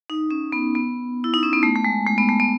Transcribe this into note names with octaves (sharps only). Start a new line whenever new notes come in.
D#4
C#4
B3
B3
E4
D#4
C#4
B3
A3
A3
G#3
A3
B3
A3
B3